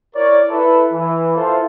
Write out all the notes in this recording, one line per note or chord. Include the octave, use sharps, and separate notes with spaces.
E4 A#4 C#5 D5
E4 A4 B4
E3
E4 F4 A4 C5